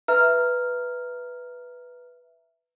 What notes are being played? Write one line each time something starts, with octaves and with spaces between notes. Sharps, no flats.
B4 E5 A#5 F6